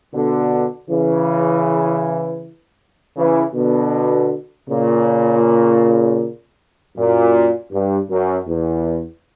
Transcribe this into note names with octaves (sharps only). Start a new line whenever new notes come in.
B2 D3
C#3 E3
C#3 E3
B2 D3
A#2 C#3
F#2 A#2
G2
F#2
E2